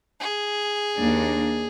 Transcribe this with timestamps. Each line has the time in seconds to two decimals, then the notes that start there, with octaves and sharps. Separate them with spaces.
0.20 G#4
0.98 D#2 A#3 D4